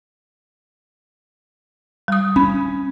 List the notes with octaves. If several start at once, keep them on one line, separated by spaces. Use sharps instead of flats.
G3 D#6
C#4 B5